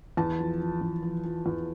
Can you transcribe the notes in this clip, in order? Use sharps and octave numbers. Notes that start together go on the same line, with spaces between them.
E2 A5
F3
F3
E2
F3
F3
E2